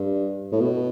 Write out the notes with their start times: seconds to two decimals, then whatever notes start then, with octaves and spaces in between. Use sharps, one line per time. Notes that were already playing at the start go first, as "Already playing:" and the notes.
Already playing: G2
0.52 A2
0.61 B2